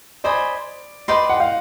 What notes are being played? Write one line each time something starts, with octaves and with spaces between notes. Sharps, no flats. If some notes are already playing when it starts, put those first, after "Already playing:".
C5 D5 D#5 G#5 B5
B4 D5 D#5 G5 C6
F#5
F5